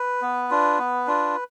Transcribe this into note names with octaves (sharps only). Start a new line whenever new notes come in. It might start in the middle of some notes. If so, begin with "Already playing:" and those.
Already playing: B4
B3
D4 F4
B3
D4 F4